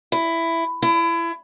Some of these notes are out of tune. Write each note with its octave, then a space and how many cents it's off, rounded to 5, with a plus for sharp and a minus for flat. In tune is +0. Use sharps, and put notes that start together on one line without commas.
E4 +10
E4 +30